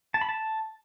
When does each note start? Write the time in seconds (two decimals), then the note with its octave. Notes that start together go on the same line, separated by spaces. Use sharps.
0.14 A5
0.21 B5
0.29 A5